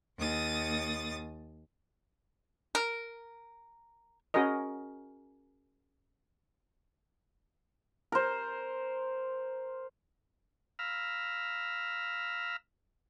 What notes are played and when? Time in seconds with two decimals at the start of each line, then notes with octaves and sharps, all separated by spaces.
0.18 D#2 D#6 A6
2.75 A#4
4.34 C#4 F#4 G#4 A#4 D#5
8.12 A#4 C5
10.79 F5 A#5 B5 E6 F6